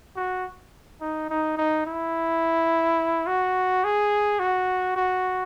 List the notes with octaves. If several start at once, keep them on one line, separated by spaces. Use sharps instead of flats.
F#4
D#4
D#4
D#4
E4
F#4
G#4
F#4
F#4